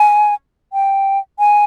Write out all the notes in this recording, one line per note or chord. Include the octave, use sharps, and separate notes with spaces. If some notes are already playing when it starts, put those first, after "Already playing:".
Already playing: G#5
G5
G#5